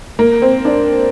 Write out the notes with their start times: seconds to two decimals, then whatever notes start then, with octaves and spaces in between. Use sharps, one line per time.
0.19 A#3
0.42 C4
0.65 D4